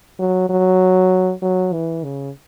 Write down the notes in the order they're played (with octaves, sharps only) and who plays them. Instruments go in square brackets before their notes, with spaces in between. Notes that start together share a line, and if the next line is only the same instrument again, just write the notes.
[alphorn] F#3
F#3
F#3
E3
C#3